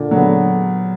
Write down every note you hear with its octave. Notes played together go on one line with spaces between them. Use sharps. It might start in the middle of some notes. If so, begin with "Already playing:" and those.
Already playing: A#2 D3
F#3 B3